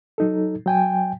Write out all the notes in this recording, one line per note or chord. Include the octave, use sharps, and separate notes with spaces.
F#3 D#4 A4
F#3 G5 G#5